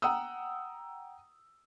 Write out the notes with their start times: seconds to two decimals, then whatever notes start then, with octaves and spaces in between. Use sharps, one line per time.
0.02 F#5 G5 A#5 D#6 E6